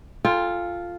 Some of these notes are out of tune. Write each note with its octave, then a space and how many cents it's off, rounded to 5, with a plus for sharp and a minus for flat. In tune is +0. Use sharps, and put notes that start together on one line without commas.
F4 +0 A4 +0 G5 +35